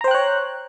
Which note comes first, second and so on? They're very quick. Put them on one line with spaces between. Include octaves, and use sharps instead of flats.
A#5 C5 G5 F#6 C#5